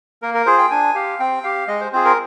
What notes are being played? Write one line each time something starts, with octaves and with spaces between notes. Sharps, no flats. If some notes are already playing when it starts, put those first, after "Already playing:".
A#3 A#4
A#4
F4 G#4 C5
G5
D4 G#5
G4 F5
C4 G5
G4 F5
G#3 D#5
C5
C4 F4 G#4 C5
A#4